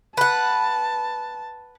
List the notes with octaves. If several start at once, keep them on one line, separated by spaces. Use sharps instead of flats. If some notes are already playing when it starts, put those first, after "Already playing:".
B4 F#5 A5